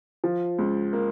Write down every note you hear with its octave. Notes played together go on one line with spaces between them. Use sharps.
F3
C#2
A#3